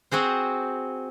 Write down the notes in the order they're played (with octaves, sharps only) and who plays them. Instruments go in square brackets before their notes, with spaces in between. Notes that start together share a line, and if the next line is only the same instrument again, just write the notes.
[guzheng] C4 F#4 G#4 C5